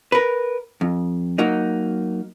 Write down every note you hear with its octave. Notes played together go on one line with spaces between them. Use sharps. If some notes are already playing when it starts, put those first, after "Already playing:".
A#4 B4
F2
F#3 A#3 D#4